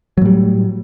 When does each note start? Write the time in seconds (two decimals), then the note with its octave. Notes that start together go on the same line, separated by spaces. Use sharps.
0.18 F#3
0.22 A2
0.25 G3